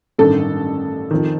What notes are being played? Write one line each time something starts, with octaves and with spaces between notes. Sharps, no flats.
A1 G2 D#3 A4
F2 D#3